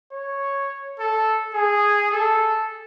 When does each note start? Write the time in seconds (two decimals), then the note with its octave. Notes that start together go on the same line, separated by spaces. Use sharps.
0.11 C#5
0.99 A4
1.54 G#4
2.12 A4